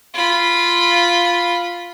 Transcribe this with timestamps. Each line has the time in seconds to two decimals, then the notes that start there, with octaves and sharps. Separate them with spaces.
0.14 F4 B5